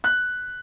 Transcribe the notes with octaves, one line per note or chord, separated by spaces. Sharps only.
F#6